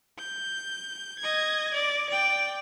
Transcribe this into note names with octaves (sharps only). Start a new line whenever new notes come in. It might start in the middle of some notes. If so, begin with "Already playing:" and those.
G6
D#5 G#6
D5
D5 G5